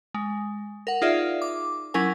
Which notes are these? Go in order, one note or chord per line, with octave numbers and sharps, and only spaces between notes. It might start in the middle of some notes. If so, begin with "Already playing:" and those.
G#3
A#4 F#5
D#4 F4 G#4 D5 E5 F5
D6
F#3 C#4 E4 A#4 G#5